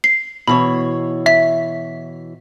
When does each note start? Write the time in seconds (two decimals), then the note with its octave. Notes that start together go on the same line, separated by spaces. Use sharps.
0.04 C7
0.48 B2 E3 C#5 B5
1.26 E5 B6